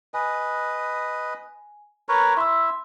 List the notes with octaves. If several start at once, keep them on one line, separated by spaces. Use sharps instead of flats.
B4 D#5 G#5
A#4 B4 C#5
E4 E5 C6 E6